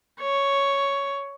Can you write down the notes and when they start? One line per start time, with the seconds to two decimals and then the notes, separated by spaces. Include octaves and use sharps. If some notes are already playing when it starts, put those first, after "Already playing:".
0.21 C#5